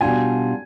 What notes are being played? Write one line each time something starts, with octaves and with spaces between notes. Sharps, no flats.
B2 G3 D4 F4 G#5